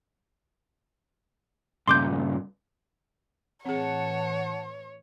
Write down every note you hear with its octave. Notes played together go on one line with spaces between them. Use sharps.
G2 A#2 C#3 C6 D6 G6
A2 E3 C4 G#4 C#5 F#5 A5